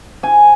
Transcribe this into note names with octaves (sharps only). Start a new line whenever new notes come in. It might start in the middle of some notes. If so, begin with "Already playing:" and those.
G#5